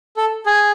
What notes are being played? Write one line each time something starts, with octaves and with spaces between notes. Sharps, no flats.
A4
G#4